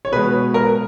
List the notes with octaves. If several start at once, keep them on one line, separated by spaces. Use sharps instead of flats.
C#5
B2 G#3 B4
A#4